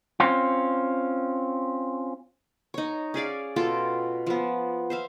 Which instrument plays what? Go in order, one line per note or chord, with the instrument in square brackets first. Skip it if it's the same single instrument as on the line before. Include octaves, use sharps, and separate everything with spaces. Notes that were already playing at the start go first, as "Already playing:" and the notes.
[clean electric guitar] C4 C#4 F4
[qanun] D#4 C#5
C#4 G#4 D5 F5
B2 F4 A4 G5
F3 B3
C5 E5 F5